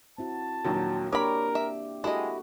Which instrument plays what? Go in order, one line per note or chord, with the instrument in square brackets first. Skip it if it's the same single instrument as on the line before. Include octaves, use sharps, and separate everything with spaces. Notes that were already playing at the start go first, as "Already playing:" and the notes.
[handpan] C4 E4 F#4 [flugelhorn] A5
[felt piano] A#1 D#2 F#3
[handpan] A#3 D4 G4 [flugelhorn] A#4 [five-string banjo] C#5 B5 [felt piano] D6
[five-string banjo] E5
[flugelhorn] G#3 [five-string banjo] E4 D#5 [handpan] F#4 G4 A4